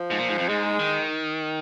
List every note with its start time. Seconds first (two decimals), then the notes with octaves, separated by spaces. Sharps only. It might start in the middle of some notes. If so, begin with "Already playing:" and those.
Already playing: F3
0.11 G#2
0.18 A#2
0.29 G#2
0.38 F2
0.48 G#2 G#3
0.79 D#3